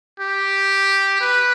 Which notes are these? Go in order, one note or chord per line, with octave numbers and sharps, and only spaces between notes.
G4
B4